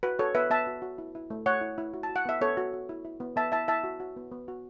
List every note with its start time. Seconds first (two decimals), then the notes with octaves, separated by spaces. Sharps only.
0.03 F#4 B4
0.19 F#4 A4 C#5
0.35 B3 B4 E5
0.50 B3 E5 A5
0.67 F#4
0.82 F#4
0.98 E4
1.15 E4
1.30 A3
1.46 A3 C#5 F#5
1.61 E4
1.78 E4
1.94 F#4
2.03 A5
2.09 F#4
2.16 F#5
2.25 B3 E5
2.41 B3 A4 C#5
2.57 F#4
2.73 F#4
2.89 E4
3.05 E4
3.20 B3
3.36 B3 E5 A5
3.52 E4 E5 A5
3.68 E4 E5 A5
3.84 F#4
4.00 F#4
4.16 B3
4.31 B3
4.48 F#4